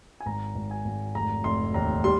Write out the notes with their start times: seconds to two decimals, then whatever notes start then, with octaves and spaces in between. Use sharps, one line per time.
0.20 G#5
0.26 G#1 A#5
0.55 G#1
0.71 G#5
0.85 G#1
1.15 F1 A#5
1.44 F1 C6
1.74 D#2 A#5
2.04 G3 C6